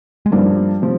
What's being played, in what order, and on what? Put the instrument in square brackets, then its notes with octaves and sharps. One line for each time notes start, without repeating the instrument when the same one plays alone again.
[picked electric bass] G#3
[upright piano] G2 F3 A#3 D4 [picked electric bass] G3
[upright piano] C3 F3